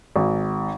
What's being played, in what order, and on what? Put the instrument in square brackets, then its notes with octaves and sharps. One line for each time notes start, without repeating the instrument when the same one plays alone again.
[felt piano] G#1